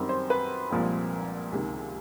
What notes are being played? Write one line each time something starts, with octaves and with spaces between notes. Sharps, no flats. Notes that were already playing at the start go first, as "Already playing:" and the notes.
Already playing: F#2 D#3 G3 C4
C5
B4
C2 A#2 F3 G#3 C4
C#2 C3 D#3